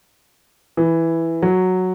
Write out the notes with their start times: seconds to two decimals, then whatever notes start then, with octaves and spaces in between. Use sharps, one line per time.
0.77 E3
1.42 F#3